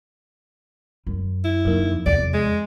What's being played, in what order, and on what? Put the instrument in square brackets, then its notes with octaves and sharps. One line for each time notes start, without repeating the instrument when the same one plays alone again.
[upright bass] F#2
[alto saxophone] E4
[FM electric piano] F#2 A#3 D#4 [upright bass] D3
[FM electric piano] F2
[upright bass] E2 C3 [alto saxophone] D5
[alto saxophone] G#3